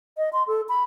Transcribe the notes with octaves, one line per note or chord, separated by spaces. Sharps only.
D#5
C6
A4
B5